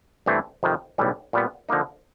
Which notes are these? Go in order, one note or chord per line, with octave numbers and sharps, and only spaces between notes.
G2 E3 A3 C4
F2 C3 D#3
B1 A2 E3 G3
A#2 G3 B3
D3 F3 A#3 D#4